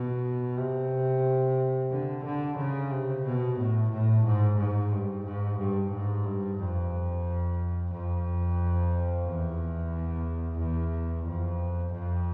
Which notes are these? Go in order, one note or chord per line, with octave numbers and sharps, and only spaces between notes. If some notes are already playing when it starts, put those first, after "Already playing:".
Already playing: B2
C3
D3
D3
C#3
C3
B2
A2
A2
G#2
G#2
G2
G#2
G2
G#2
G2
F2
F2
E2
E2
F2
F2